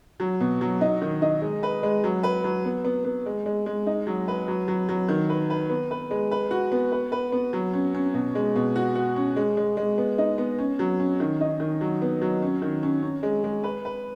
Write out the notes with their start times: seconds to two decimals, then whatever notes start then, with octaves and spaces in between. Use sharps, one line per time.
0.20 F#3
0.40 B2
0.61 F#3
0.81 D#4
1.02 D#3
1.22 D#4
1.42 G#3
1.63 B4
1.83 G#3
2.04 F#3
2.23 B4
2.44 F#3
2.65 B3
2.85 B3
3.05 B3
3.26 G#3
3.46 G#3
3.66 G#3
3.86 D#4
4.07 F#3
4.28 B4
4.48 F#3
4.68 F#3
4.89 F#3
5.08 D#3
5.29 B4
5.50 B4
5.70 B3
5.91 B4
6.11 G#3
6.31 B4
6.51 F#4
6.72 B3
6.92 B4
7.12 B4
7.32 B3
7.53 F#3
7.73 C#4
7.94 C#4
8.14 B2
8.35 G#3
8.56 B2
8.76 F#4
8.95 F#4
9.16 C#4
9.36 G#3
9.57 G#3
9.77 G#3
9.98 B3
10.18 D#4
10.38 B3
10.58 C#4
10.79 F#3
11.00 C#4
11.20 D#3
11.41 D#4
11.60 D#3
11.81 F#3
12.02 B3
12.22 F#3
12.42 C#4
12.62 D#3
12.83 C#4
13.02 C#4
13.23 G#3
13.44 G#3
13.64 B4
13.85 B4